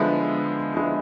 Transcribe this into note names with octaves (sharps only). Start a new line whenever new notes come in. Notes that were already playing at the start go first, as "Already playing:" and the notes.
Already playing: D3 F3 G#3 B3 E4
D3 F3 G#3 B3 E4